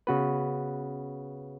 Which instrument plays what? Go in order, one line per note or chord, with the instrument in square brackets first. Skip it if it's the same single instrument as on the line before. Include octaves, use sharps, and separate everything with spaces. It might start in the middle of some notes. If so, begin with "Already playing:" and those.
[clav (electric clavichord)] C#3 B3 F#4 B4